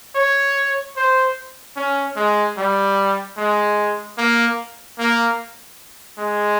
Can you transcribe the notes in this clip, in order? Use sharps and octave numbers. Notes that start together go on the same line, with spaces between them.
C#5
C5
C#4
G#3
G3
G#3
A#3
A#3
G#3